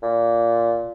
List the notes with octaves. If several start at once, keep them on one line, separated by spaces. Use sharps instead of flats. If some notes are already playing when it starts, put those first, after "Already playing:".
A#2